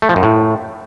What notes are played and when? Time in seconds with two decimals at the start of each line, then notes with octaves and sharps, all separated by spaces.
0.02 A3
0.09 F3
0.16 F#2
0.23 A2